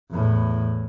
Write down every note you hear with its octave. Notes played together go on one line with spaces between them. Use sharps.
E2 A2